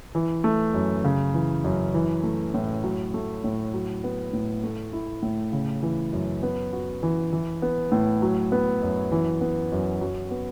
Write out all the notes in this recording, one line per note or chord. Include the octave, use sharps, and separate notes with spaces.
E3
A3
F#2
C#3
E3
F#2
E3
A3
A2
F#3
A3
A2
F#3
B3
A2
A3
E4
A2
C#3
E3
F#2
B3
F#4
E3
E3
B3
A2
F#3
B3
F#2
E3
B3
F#2
F#3
B3